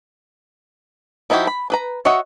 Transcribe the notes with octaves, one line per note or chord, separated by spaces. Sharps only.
F3 D#4 E4 F#4 G4
B5
D4 B4 A#5
F#4 C#5 D#5 E5 F#5